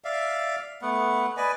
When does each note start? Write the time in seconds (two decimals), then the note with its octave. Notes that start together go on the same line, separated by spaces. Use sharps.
0.04 D5 E5 F5
0.82 A3 B3 F#5
1.37 B4 D5 D#5 G#5